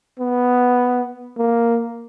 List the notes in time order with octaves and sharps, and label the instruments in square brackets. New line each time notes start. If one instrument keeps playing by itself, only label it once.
[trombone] B3
A#3